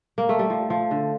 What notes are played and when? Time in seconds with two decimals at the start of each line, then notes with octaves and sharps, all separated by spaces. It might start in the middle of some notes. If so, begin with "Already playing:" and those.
0.18 A#3
0.29 A3
0.39 G3
0.50 F3
0.70 F3
0.91 D3